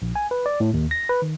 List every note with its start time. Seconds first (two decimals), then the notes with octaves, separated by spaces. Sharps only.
0.02 A#1
0.16 G#5
0.31 B4
0.46 D5
0.60 A2
0.74 D#2
0.91 A#6
1.09 B4
1.22 D#3